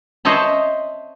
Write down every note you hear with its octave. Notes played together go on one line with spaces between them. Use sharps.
C5 C#5 D#5 E5 A5 B5